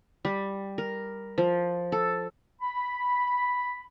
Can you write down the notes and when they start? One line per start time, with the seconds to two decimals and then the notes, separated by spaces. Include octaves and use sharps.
0.25 G3
0.78 A#4
1.38 F3
1.92 A4
2.62 B5